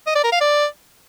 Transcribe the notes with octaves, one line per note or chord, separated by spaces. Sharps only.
D#5
D5
A#4
F5
D5